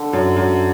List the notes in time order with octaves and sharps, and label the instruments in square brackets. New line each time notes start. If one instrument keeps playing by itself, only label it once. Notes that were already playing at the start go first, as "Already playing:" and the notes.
Already playing: [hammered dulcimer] D3
[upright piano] F#2
F#2